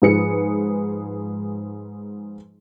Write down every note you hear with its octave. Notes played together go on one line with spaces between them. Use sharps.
G#2 F3 G#4 B4 C#7